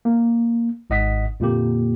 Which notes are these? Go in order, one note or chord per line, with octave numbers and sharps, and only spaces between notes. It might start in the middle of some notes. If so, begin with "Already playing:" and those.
A#3
G#1 G#2 D#5 F#5 D#6 B6
F2 A#2 D3 A#3 G4